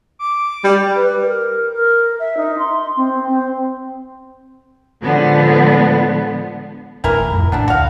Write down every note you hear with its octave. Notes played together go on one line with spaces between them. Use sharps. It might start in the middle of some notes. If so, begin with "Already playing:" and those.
D6
G3
B4
A#4
A#4
E5
D#4
C6
C4
C4
A2 D3 F3 G#3 B3
D#1 D#2 E3 A3 E4 A#4
F2 A2 C3
D#1 A2 B3 D4 E4
D2 C3 F#4 F5